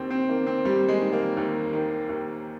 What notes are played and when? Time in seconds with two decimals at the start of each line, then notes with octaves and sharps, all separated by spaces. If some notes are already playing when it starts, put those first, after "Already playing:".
Already playing: D#2 C4
0.10 C4
0.29 D#3 A#3
0.47 C4
0.65 D#2 G3
0.88 G#3
1.01 D#3
1.12 A#3
1.37 D#2
1.73 D#3
2.09 D#2